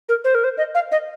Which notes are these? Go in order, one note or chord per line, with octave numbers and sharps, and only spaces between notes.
A#4
C5
A#4
C5
D#5
F5
D#5